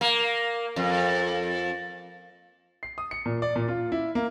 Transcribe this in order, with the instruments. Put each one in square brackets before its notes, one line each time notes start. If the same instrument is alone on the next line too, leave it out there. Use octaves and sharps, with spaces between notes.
[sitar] A#3
F2
[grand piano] C7
D#6
C#7
A#2
D5
A#2
F4
E4
A#3